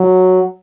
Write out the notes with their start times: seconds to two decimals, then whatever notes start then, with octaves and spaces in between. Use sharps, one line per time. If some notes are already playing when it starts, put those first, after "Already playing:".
Already playing: F#3